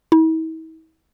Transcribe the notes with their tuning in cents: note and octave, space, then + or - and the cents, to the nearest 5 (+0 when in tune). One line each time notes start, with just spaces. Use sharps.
E4 -45